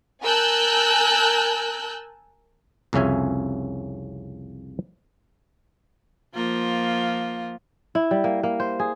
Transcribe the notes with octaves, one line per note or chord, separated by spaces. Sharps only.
A#4 G#5 A5 E6 F#6 G6
C2 F2 C#3 C#4 E5 G#5
F3 A#3 F4
E4
G3
A#3
A#3
C5
G#4